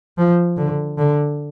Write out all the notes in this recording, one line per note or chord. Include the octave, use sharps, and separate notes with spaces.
F3
D3
D3